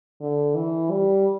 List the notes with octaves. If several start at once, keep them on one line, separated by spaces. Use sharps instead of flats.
D3
E3
G3